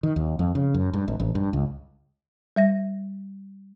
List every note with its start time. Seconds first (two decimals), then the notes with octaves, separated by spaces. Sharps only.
0.03 D#3
0.16 D#2
0.39 F2
0.55 C#3
0.74 F#2
0.93 G2
1.08 G#1
1.20 A1
1.35 G2
1.53 C#2
2.56 G3 E5 A#6